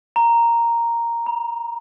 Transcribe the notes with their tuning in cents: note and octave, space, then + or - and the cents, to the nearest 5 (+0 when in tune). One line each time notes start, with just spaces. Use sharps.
A#5 +0
A#5 +45